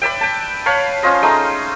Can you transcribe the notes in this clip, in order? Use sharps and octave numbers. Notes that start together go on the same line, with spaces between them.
B4 D5 E5 G5
G5 A5
B4 C#5 F5 A5
C#4 F4 C5 D#5
G#3 A3 D#4 D#6